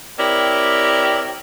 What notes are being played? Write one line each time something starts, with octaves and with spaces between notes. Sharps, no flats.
C4 E4 G4 A#4 C#5 D5